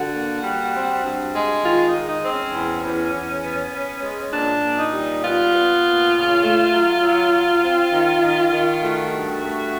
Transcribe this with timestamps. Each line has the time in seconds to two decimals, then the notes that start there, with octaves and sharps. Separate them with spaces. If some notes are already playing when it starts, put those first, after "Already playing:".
Already playing: D3 F#4
0.13 A#3
0.43 G3
0.73 C4
1.04 G2
1.33 G#3
1.64 D#3 F4
1.86 D#4
1.93 G#3
2.08 D#4
2.23 C4
2.31 C#4
2.53 E2
2.84 E2
3.13 E2
3.43 B3
3.73 B3
4.03 G#3
4.33 A#2 D4
4.63 A#2
4.77 D#4
4.93 G3
5.23 B3 F4
5.53 B3
5.82 A#2
6.13 C#3
6.43 A3
6.72 F#3
7.02 F#3
7.32 F#3
7.63 C4
7.93 D#3
8.22 D#3
8.53 D#3
8.82 A3 F#4
9.12 G2
9.42 A3